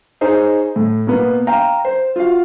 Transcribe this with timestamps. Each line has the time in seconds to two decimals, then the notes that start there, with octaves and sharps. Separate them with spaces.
0.21 D#4 G#4 C5 C#5
0.76 A2
1.07 B2 A#3 B3
1.47 F5 G5 A#5
1.85 C5
2.16 F4 F#4 F5